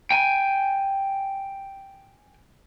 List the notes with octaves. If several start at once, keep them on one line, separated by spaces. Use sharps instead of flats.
G5 G#5